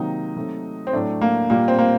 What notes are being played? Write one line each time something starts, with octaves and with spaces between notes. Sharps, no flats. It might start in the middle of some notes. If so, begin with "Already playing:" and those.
Already playing: C3 D#3 F#3 A#3 D#4
C3 F#3 A3
C4
A2 F#3 A3 D4
A#3
A#2 G3 A#3
C4
A#3